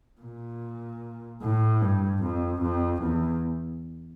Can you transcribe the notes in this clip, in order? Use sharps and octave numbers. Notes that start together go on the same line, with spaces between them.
A#2
A2
G2
F2
F2
E2